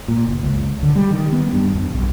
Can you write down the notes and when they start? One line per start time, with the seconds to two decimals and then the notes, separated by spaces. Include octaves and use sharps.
0.08 A#2
0.27 F#1
0.43 C#2
0.83 D3
0.96 G3
1.11 D#3
1.32 B3
1.53 G2
1.75 F2
1.94 B1